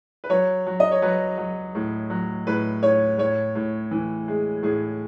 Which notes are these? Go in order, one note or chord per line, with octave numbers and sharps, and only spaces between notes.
B4
F#3 C#5
F#3
D#5
C#5
F#3 B4
F#3
A2
F#3
A2 B4
A2 C#5
A2 C#5
A2
E3
G#3
A2 G#4